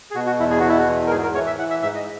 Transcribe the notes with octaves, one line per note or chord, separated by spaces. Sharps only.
G#4
B2 F#4
F#4
E2 E4
G#4
B2 F#4
E4
F#4
E2
A#4
G#2 G#4
A#4
E3 C#5
E5
E3 F#5
E5
G#2 E5
D#5